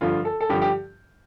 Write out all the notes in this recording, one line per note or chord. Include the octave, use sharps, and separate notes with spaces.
G2 D3 F3 F4
A4
A4
G2 D3 F3 G4
G4